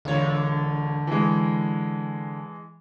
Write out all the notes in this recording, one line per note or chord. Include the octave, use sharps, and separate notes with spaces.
E1 D3 F4 C#5
E3 G#3